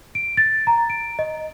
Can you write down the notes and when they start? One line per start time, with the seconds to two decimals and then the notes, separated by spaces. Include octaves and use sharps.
0.15 D7
0.37 A6
0.67 A#5
0.90 D7
1.19 D#5